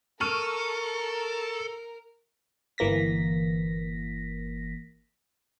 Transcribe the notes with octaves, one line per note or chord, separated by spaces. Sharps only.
A4 A#4 C#6 F6 D#7
G1 E3 A#3 A#6 B6